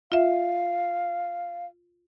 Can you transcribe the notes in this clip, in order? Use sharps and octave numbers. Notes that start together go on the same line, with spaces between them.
F4 E5 F5